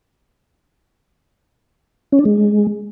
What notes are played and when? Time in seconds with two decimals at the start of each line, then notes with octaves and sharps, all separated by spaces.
2.12 C#4
2.19 D4
2.25 G#3